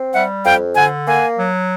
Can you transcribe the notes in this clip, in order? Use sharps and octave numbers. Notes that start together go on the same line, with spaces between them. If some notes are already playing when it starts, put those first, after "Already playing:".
Already playing: C4
G3 E5 F#5
F2 F5 G5
D3 F#5 G#5
A#3 F#5 G#5
F#3